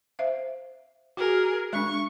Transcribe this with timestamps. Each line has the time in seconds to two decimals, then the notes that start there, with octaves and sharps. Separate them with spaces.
0.19 C5 E5 F5
1.17 F#4 G#4 A#4
1.73 G#3 D4 C#6